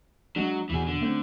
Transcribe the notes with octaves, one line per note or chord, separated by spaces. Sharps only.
F#3 G#3 D4
E2 B2 E3 G#4
D3
A3 C4 C#4